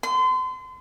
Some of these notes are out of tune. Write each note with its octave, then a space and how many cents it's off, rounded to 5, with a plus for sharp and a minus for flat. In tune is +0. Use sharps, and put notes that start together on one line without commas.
C6 -35